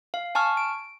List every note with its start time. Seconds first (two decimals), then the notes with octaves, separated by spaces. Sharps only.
0.14 F5
0.35 G#5 A5 C#6 F6
0.57 D7